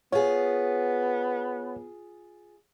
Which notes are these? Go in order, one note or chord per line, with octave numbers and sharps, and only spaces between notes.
B3 F4 G#4 C#5